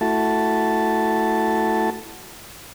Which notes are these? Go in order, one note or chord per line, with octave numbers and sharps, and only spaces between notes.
A3 E4 F#4 A5